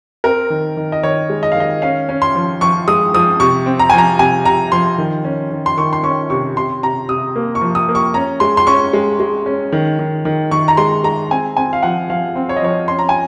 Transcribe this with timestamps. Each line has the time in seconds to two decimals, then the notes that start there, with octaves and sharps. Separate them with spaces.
0.24 C4 A#4
0.50 D#3
0.77 D#3
0.92 D#5
1.03 D#3 C#5
1.29 G#3
1.43 D#5
1.52 F5
1.55 D#3 D#5
1.82 C#4 F5
2.09 C#4
2.22 C6
2.35 F3
2.61 F3 C#6
2.88 G#3 D#6
3.14 F3 D#6
3.40 C3 C#6
3.66 C4
3.79 A#5
3.90 F3 G#5
3.98 A#5
4.19 C3 G#5
4.45 C3 A#5
4.72 F3 C6
4.98 D#3
5.24 C#4
5.51 D#3
5.66 C6
5.77 D#3 C#6
5.93 C6
6.04 C#4 C#6
6.30 C3 C#6
6.56 C3 C6
6.83 C3 A#5
7.08 C3 D#6
7.36 A#3
7.55 C#6
7.61 F3
7.75 D#6
7.89 A#3
7.95 C#6
8.14 C#4 A#5
8.40 G#3 C6
8.57 C6
8.67 C#4 C#6
8.93 G#3
9.20 G#3
9.46 C#4
9.72 D#3
9.99 D#3
10.25 D#3
10.51 D#3 C#6
10.68 A#5
10.77 G#3 C6
11.04 G#3 A#5
11.31 C4 G#5
11.57 C4 G#5
11.73 F5
11.83 F3 F#5
12.10 F3 F5
12.36 C4
12.49 C#5
12.56 D#5
12.62 F3 C#5
12.88 C#4 C6
12.99 A#5
13.09 G#5